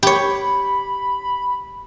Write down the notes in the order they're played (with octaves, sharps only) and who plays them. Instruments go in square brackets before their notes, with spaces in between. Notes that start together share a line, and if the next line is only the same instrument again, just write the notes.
[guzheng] G4 C#5 [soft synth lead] B5